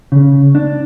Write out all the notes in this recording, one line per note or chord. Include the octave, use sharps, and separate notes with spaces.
C#3
D4